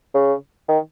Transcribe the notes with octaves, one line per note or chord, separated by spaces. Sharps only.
C#3
D#3